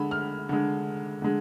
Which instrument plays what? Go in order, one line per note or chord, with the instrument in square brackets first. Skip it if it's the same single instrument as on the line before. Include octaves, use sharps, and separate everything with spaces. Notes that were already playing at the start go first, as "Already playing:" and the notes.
Already playing: [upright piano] D3 G#3 B5
F6
D3 G#3
D3 G#3